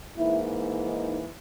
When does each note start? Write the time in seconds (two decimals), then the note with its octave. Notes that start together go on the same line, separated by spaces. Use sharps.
0.17 G#2 E3 A#3 E4
0.86 D#4